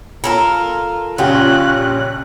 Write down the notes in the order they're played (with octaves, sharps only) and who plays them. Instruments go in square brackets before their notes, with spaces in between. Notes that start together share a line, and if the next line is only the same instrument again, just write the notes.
[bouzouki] F4 A4 A#4
[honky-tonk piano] A#1 C#3 G4 [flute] C#4 [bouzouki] F4 [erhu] F#6